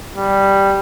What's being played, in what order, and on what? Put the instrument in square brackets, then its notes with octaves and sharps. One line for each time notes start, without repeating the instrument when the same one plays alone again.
[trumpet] G3